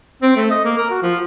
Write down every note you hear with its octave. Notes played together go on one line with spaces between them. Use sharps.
C4
A3
D#5
A#3
A#4
F#4
F3